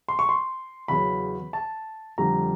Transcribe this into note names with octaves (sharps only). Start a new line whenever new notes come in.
C6
C#6
C6
E2 C#3 F#3 B5
A5
F2 D3 G3 A#5